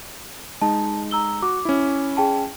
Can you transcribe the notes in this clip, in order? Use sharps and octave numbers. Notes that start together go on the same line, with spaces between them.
G#3 D#4 A5
A#5 E6 G7
F#4 D6
C#4 E4
G#4 G5 A5